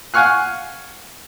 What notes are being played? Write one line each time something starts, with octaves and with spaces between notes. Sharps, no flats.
F5 F#5 G#5 C#6 F6 F#6